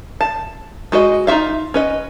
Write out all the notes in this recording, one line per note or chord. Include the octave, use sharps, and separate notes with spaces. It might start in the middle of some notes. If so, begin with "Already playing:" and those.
A5
G#3 F#4 B4 D#5
D#4 F4 F#4 E5 F5
C#4 B4 D#5